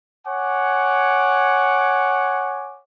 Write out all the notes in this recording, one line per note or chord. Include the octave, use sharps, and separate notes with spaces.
C#5 F#5 G#5 D6